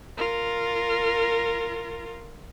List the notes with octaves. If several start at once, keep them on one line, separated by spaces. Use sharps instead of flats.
F4 A#4